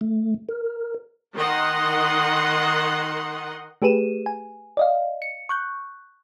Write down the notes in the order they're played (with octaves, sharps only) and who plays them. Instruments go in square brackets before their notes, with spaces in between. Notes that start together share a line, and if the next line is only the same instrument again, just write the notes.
[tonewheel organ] A3
A#4
[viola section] D#3 A#4 D#5 F#5 C6
[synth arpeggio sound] A3 G4 G#4 B4 D#7 E7
G#5
D5 D#5 F5
C#7
C#6 F#6 G6